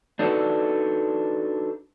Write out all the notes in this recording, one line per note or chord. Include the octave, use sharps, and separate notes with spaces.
D4 D#4 F#4 A4 B4 D5